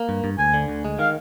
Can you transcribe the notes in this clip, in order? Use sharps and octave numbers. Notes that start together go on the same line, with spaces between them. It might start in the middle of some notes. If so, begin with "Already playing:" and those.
Already playing: A#3
G2
G2
D2 G#5
D3
D2
G#3
D#3 F5